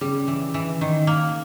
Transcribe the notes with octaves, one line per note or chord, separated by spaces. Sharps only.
C#3 G3
E3
E3
D#3
A#3